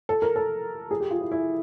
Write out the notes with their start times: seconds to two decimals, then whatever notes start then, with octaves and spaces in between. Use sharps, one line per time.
0.09 A4
0.22 A#4
0.36 A4
0.91 G#4
1.00 G4
1.11 F4
1.21 E4
1.32 E4